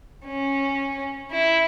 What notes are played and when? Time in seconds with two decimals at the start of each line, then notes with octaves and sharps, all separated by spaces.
0.25 C#4
1.32 E4